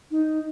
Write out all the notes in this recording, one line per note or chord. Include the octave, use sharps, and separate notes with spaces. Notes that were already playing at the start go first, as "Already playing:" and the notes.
D#4